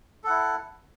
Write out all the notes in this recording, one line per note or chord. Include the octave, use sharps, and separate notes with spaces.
E4 A4 F#5